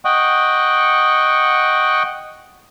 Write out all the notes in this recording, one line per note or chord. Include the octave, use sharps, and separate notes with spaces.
D#5 F#5 G5 C#6